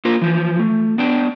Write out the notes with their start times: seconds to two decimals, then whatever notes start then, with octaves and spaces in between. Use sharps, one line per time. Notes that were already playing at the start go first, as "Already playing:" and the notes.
0.05 A#3 F4 A#4 C5
0.21 E3 F3
0.59 A3
0.98 B3 D4 G5